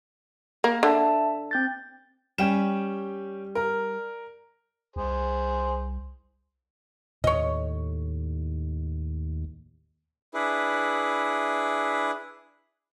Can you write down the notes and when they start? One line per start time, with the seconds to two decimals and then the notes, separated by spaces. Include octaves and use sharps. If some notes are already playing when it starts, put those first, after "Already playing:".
0.64 A#3
0.83 D3 E5 A5
1.51 C4 G6 A6
2.38 G3 C#4 G5 E7
3.55 A#4
4.96 C2 G#4 C5
7.24 D#2 A2 C#5 D#5
10.34 D4 E4 G#4 B4